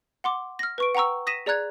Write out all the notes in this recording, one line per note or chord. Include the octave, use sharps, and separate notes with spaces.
F#5 C6 D6
F6 A#6
B4 C#6 D7
F#5 G5 A#5 C#6 E6
D#6 A#6 B6 D#7 E7
G#4 D5 A#5 F#6 G#6